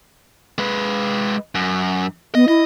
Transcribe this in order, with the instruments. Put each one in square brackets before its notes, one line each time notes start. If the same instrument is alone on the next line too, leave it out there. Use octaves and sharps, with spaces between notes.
[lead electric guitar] G#3 B4
F#2
[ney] B3 [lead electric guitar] D#5
[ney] E4 [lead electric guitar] D#5